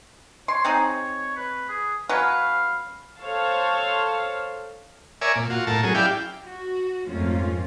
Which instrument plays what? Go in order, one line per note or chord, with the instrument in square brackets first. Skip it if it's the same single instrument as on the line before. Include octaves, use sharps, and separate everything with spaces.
[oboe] C#5 [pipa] C6
[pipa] C4 D#4 G#4
[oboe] B4
G#4
[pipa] F#3 C#4 B4 [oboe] F5
[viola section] A4 C5 C#5 F5 A5
[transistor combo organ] A#4 C#5 D5 E5 G#5
A#2
F4 F#4
A2 A#4 A5
F#3 C#4 G#4
E4 G4 D5 F5 G5
[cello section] F#4
F2 G#2 A3 A#3 C#4 F4